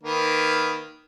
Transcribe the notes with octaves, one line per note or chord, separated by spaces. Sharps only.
D#3 A#3 B4